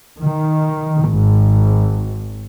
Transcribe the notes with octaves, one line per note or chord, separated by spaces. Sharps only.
D#3
G#1